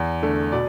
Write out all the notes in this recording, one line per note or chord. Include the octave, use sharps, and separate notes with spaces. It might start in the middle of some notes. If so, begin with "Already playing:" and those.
Already playing: E2
D3 A3
B2 D5